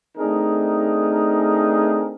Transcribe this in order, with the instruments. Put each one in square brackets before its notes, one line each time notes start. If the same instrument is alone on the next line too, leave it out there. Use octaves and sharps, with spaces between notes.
[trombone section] A3 C4 D4 D#4 G#4 A#4